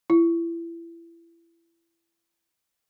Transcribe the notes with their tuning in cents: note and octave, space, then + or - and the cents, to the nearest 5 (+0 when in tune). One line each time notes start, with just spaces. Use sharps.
E4 +30